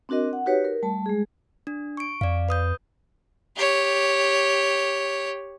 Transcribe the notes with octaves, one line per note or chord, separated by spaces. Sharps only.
C4 D4 F#4 A#4 D#5
F#5
D#4 F#4 G4 B4 C#5
A#4
G3 A3 A5
G#3 G#4
D4
C#6 D7
F2 D5 F5
B4 D#6 G6
G4 C#5